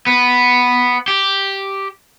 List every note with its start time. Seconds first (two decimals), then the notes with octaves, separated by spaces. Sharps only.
0.07 B3
1.08 G4